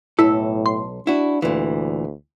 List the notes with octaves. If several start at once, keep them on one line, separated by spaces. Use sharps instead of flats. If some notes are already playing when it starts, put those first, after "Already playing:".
B1 A2 E4 A4 E6
C6
D4 E4 F#4
D2 A#2 E3